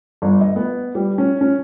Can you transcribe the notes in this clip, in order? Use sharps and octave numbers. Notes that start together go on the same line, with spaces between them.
G1
D#5
B3
G3
C#4
C#4